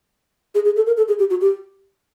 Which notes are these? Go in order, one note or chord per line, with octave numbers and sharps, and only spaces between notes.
G#4
G#4
A4
A#4
A4
G#4
G4
F#4
G4